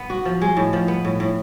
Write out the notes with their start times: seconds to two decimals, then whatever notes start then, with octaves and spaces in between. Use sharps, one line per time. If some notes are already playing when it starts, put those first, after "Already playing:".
Already playing: B3
0.10 F#4
0.25 F3
0.42 G#3
0.57 A2
0.73 F3
0.88 B3
1.05 A2
1.20 A2